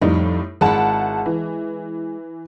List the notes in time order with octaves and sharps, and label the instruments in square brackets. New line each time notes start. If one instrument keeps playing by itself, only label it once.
[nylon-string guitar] F2 [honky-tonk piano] A2 G3 D#4
[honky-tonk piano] G#1 F#5 A5 [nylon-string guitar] G#3 E4
[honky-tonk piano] E3